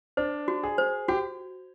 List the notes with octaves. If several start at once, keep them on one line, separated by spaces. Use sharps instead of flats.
D4 C5
F#4
G#4
C5
F#4 G4